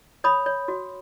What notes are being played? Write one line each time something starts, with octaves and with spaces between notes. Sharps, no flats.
C#5 B5 D#6
C#5
F#4